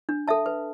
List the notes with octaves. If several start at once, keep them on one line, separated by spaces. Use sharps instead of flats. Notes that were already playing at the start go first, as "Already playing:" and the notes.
D4
A4 E5 A5
B4